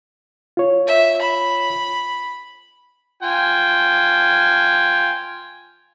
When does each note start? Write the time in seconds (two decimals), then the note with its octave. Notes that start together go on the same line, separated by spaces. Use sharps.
0.57 F4 C#5
0.87 E5
1.22 B5
3.23 F4 G5 G#5